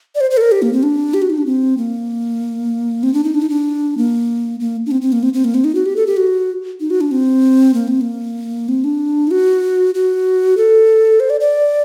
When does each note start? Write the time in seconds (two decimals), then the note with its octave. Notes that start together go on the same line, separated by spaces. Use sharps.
0.15 D5
0.21 C5
0.31 C5
0.37 A4
0.41 A#4
0.51 G4
0.62 A#3
0.73 C4
0.83 D4
1.14 G4
1.22 F#4
1.30 D#4
1.38 D4
1.46 C4
1.77 A#3
3.03 C4
3.14 D4
3.24 D#4
3.34 D4
3.42 D#4
3.50 D4
3.97 A#3
4.60 A#3
4.86 D4
4.91 C4
5.01 C4
5.12 A#3
5.23 C4
5.33 C4
5.44 A#3
5.54 C4
5.64 D#4
5.75 F#4
5.86 G4
5.96 A4
6.06 G4
6.17 F#4
6.80 D#4
6.90 F#4
7.01 D4
7.11 C4
7.74 A#3
7.88 C4
8.01 A#3
8.68 C4
8.84 D4
9.27 D#4
9.31 F#4
9.94 F#4
10.57 A4
11.20 C5
11.30 D5
11.40 D5